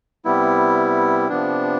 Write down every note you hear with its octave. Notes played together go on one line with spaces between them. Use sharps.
C3 G3 B3 E4
C3 F3 B3 D4